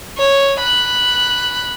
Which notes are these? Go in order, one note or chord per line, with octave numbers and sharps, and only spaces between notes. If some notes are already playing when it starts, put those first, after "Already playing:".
C#5
B5 F#6